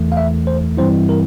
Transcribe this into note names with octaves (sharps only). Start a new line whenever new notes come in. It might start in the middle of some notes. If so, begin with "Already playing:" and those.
Already playing: E2 E3 A3
F5
E5
C5
G2 E3 G3 C4 E4 C5
A#4